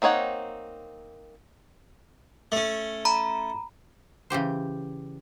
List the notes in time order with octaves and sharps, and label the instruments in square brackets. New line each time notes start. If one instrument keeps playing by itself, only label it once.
[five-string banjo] A#3 C4 D#4 C#5 F#5
[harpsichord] A3 C#4
[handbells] A#5 B5
[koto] C#3 E3 G4 C5